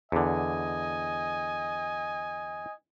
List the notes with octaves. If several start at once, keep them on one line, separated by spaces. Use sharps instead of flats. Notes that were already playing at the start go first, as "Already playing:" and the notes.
E2 D3 D#5 G#5